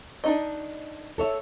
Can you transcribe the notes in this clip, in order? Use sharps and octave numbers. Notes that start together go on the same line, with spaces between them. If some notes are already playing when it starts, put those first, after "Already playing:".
D4 D#4 D#5
A4 C#5 E5